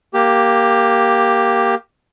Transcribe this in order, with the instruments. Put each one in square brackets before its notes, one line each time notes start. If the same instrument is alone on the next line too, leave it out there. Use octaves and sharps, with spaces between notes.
[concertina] A#3 G4